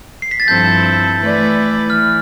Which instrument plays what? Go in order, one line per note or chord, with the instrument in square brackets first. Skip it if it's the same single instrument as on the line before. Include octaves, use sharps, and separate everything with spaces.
[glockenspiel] C7
B6
A6
[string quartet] G2 F3 C4 E4 A4 [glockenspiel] G6
[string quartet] E3 A3 E4 B4 D5
[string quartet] E3 [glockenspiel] F6